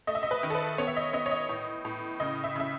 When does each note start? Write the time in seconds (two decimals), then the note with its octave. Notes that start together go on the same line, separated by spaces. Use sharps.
0.07 A3 D#5
0.15 E5
0.23 D#5
0.31 B4
0.43 D#3
0.50 A4
0.55 B4
0.78 B3 C#5
0.87 E5
0.97 D#5
1.13 B3 D#5
1.26 C#5
1.31 D#5
1.49 A2
1.85 A2
2.20 C#3 D#5
2.44 E5
2.56 C#3 E5